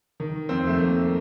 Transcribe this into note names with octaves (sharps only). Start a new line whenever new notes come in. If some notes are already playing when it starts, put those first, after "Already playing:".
D#3
F2 C4
A3
F2 A#3